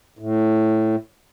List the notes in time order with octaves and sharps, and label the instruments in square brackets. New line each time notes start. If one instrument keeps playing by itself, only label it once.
[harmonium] A2